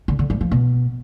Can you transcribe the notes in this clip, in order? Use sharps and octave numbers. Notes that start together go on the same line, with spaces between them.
D3
D3
G2
F3
B2